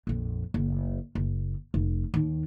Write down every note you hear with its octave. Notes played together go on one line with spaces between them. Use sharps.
A#1 F2
F#1
F#1
F1
D#2 D#3